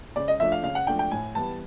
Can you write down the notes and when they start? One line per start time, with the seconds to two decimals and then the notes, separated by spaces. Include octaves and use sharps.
0.16 C#3 D5
0.28 D#5
0.40 F3 A3 D4 E5
0.52 F5
0.63 C#3 F5
0.75 F#5
0.87 F3 A3 D4 G5
0.99 G5
1.11 A2 G#5
1.35 E3 G3 B3 A5